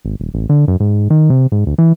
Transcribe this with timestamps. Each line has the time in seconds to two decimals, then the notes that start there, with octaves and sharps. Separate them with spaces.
0.05 G#1
0.20 D#1
0.34 A1
0.49 D3
0.68 F#2
0.80 G#2
1.10 D#3
1.30 C3
1.52 G#2
1.67 D2
1.78 E3